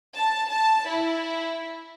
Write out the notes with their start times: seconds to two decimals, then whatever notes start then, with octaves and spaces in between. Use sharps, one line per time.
0.16 A5
0.51 A5
0.88 E4